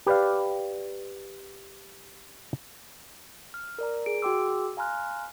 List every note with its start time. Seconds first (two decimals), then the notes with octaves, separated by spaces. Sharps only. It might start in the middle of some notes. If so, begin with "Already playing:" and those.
0.06 G4 B4 D5 F5
3.54 F6
3.79 A#4 D5 A#5
4.06 G#4 D7
4.22 F#4 G#4 G5 C6 D6 E6
4.77 F5 G#5 A#5 C6 F6 F#6